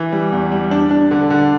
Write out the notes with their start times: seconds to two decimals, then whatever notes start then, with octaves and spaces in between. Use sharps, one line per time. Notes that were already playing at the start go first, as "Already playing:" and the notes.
Already playing: E3
0.12 G3
0.32 E2
0.52 G3
0.71 D4
0.91 D4
1.11 D3
1.30 D3